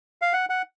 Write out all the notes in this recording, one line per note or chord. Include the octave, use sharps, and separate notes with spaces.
F5
F#5
F#5